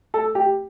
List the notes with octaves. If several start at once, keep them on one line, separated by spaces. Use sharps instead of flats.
A4
G4